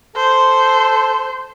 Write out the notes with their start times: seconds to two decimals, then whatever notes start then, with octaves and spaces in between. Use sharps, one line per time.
0.16 A4 C5